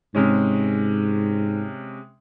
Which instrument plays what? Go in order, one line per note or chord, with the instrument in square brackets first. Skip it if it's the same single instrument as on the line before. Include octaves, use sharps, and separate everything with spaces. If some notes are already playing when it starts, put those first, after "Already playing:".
[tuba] G#2 [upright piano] C3 G#3 C#4